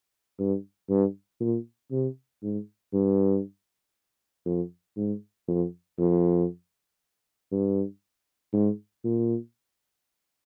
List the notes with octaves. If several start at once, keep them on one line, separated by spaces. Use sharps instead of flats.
G2
G2
A#2
C3
G#2
G2
F2
G#2
F2
F2
G2
G#2
A#2